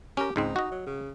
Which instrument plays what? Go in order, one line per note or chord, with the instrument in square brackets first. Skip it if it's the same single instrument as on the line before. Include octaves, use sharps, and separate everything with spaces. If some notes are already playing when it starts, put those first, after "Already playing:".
[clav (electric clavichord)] C#4 A#4 [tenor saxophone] G4
[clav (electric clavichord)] C#2 G#2 C4 [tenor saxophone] D#4
[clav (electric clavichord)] F#4 D#5
[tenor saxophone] F#3
C#3